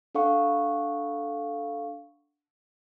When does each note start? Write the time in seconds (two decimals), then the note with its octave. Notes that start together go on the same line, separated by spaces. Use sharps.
0.15 D4 A4 F5 F#5 C#6